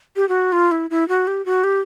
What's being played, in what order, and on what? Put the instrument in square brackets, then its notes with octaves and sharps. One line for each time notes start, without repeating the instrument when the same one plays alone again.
[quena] G4
F#4
F4
E4
E4
F#4
G4
F#4
G4